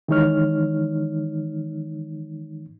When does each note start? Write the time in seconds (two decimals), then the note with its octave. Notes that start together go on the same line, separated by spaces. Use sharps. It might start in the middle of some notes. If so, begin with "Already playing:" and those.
0.08 D#3 E3 G#3 D#4 C#5 F6